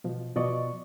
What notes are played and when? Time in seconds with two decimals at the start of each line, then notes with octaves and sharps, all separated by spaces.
0.04 B2 F3
0.36 B2 F3 D5 D#5 C#6